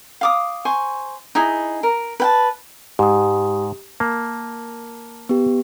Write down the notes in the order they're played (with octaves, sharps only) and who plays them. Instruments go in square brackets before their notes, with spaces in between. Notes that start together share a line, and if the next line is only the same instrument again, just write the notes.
[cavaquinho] F5 D6 D#6
C5 G#5 C#6
D#4 E4 G#4
A#4
B4 G5 A5
[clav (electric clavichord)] G#2 [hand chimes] G4 D#6
[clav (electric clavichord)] A#3 [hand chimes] A5
[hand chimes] B3 G4